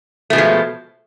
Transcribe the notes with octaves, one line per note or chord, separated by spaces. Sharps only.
B2 F3 G#3 A3